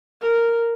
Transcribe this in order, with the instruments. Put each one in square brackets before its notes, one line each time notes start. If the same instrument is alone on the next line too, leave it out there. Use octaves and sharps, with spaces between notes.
[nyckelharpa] A#4